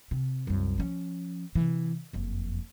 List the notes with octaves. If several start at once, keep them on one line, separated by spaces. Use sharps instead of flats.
C3
C2 F#2
F3 C#4
C3 E3
F#1 F2